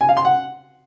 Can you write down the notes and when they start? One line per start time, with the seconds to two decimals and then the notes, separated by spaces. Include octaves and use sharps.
0.01 G#5
0.09 F5
0.17 C6
0.25 F#5